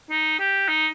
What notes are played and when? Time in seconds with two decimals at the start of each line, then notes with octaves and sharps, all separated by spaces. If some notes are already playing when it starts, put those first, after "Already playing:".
0.10 D#4
0.39 G4
0.68 D#4